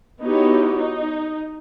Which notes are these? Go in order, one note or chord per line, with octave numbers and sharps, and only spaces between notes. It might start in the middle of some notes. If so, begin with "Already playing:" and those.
B3 D#4 E4 F#4 G4 C#5
D#4